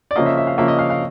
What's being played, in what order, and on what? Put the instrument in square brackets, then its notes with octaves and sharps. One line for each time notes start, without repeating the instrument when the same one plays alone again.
[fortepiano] D5
C#3 F3 A#3 D#5
E5
E5
F5
C#3 F3 A#3 E5
D#5
F5
F5